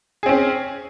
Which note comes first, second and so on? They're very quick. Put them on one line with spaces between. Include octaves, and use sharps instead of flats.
G#4 C4 C#4